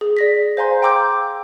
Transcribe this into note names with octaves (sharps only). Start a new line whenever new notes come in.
G#4
D5 A#6 B6
C5 F5 G#5 A#5 C6 G6
G5 A#5 C6 D6 E6 G6